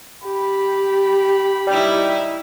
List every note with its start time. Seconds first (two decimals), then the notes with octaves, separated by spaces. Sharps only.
0.23 G4 B5
1.67 G3 D#4 E4